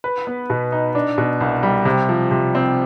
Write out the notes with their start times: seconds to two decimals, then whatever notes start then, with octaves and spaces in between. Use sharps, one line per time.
0.04 B4
0.27 B3
0.50 B2
0.72 D#4
0.95 D4
1.18 B2
1.41 C2
1.63 G3
1.85 C3
2.09 F3
2.31 C3
2.55 C4